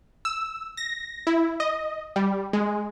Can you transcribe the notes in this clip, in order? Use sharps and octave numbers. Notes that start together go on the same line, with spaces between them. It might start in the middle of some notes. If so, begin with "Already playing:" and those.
E6
A#6
E4
D#5
G3
G#3